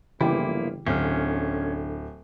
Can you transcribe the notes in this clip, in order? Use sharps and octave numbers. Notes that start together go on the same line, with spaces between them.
G1 C#3 E3 F3 A#3 E4 G4
D1 D3 C#4 F6